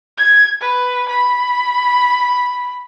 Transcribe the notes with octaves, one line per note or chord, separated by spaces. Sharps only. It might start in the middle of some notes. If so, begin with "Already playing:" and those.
G#6
B4
B5